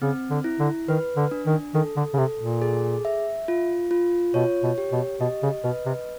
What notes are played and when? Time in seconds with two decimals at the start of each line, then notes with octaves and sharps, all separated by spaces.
0.02 C#3 C4
0.30 D3
0.44 E4
0.59 D3
0.88 D#3 B4
1.17 D3
1.31 D4
1.46 D#3
1.74 D#3 A4
1.96 D3
2.14 C#3
2.18 C3 A4
2.39 A#2
2.62 G#4
3.05 E5
3.48 F4
3.91 F4
4.34 B2 C#5
4.63 B2
4.78 G4
4.92 B2
5.20 B2 D#5
5.43 C#3
5.64 B2 B4
5.86 C3